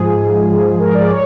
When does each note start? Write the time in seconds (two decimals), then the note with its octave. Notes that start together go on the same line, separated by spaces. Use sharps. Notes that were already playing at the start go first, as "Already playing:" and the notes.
Already playing: G#2 F3 G#3 G#4
0.18 G#2 F3 G#3
0.49 G#2 F3 G#3
0.79 G#2 F3 G#3 A#4
0.95 D5
1.10 C#5